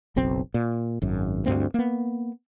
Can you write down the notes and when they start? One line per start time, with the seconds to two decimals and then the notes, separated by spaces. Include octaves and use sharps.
0.16 F#1 B1 C4
0.54 A#2
1.02 G#1 F#2
1.46 D2 G2 A#3 C4
1.74 A#3 B3